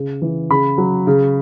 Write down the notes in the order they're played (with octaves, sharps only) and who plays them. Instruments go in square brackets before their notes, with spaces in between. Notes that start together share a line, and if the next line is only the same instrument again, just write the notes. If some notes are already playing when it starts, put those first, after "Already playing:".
Already playing: [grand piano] C#3
E3
C#3 B5
F#3
C#3